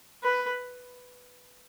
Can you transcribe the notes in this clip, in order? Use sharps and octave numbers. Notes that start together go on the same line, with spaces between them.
B4